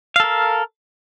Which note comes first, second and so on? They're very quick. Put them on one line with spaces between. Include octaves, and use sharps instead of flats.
F5 A4 A#4